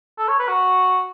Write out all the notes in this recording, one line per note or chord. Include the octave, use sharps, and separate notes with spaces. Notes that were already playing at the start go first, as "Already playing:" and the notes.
A4
C#5
B4
F#4